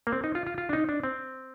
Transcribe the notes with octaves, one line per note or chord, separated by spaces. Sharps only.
A#3
C4
D#4
F4
F4
F4
D4
D#4
D4
C4